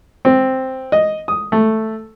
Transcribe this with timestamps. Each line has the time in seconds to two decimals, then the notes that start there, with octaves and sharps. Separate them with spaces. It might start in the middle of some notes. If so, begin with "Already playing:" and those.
0.25 C4
0.92 D#5
1.28 D#6
1.52 A3